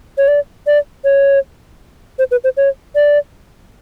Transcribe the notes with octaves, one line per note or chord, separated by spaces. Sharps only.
C#5
D5
D5
C#5
C5
B4
C5
C#5
D5